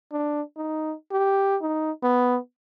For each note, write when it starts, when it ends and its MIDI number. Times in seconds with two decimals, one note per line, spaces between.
0.12 0.42 62
0.57 0.94 63
1.11 1.56 67
1.61 1.91 63
2.03 2.38 59